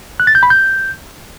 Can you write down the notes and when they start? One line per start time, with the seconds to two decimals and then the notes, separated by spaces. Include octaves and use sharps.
0.20 F#6
0.27 A6
0.35 G6
0.43 B5
0.50 G6